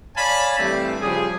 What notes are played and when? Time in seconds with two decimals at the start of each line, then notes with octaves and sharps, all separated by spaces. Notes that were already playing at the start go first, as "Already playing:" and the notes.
0.16 C#5 D5 F5 G#5 A5 B5
0.59 G2 E3 G3 A3 C4
1.02 C#3 F3 G3 G#4